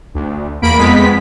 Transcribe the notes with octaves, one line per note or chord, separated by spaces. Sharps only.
D2
E2 A#3 B5 D7
F2 G#3 B3 B6